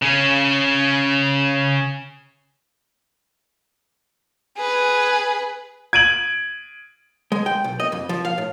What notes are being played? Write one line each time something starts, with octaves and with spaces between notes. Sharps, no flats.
C#3 C#4
G#4 B4
G#6 D7 D#7 F#7
G#3
G5
B1
D#5
F2
F3
F5
A2